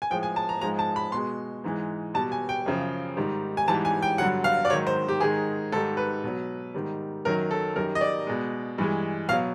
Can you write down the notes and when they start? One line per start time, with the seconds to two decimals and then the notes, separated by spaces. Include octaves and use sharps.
0.02 G#5
0.10 A2 F3 G#3 G5
0.23 G#5
0.36 A5
0.49 A#5
0.61 G#2 F3 G#3 A#5
0.79 A5
0.96 B5
1.12 B2 G#3 C6
1.64 G#2 E3 G#3
2.14 B2 G3 A5
2.32 G#5
2.49 G5
2.66 F#2 C#3 F3
3.17 G#2 D#3 G3
3.57 G#5
3.68 G#2 E3 G3 A5
3.85 G#5
4.02 G5
4.18 G2 D3 F#3 F#5
4.44 F5
4.65 D5
4.70 G#2 D#3 F#3 C#5
4.87 C5
5.09 G4
5.20 G#2 D#3 G#3 G#4
5.72 G#2 D#3 G3 A4
5.97 B4
6.24 B2 F#3
6.74 G#2 D#3 G3
7.25 F#2 D#3 F#3 A#4
7.51 A4
7.76 F#2 D#3 G3 A#4
7.95 D#5
8.01 D5
8.27 B2 G#3
8.78 G2 E3 G#3
9.29 B2 F#3 F5